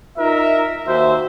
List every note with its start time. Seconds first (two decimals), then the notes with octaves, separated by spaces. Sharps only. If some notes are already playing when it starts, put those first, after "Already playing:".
0.18 D#4 F4 A#4 E5
0.85 D#2 F#4 C5 E5